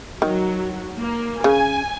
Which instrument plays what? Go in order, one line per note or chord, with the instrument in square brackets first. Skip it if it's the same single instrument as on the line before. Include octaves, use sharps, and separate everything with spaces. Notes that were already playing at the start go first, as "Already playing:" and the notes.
[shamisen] D#3 [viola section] F#3
[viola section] A#3
[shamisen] C#3 [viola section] G#5